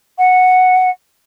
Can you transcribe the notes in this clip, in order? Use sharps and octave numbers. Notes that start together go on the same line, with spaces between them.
F#5